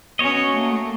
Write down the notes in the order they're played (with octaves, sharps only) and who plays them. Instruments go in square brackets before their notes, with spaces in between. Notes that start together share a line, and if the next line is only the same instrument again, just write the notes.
[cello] B3 C#4 [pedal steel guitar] F#4 C#5 D#5
[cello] A3 A#3